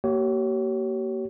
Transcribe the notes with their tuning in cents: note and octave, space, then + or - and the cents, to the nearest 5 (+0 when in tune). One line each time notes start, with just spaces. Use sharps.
A#3 +0 G4 -40 C#5 +0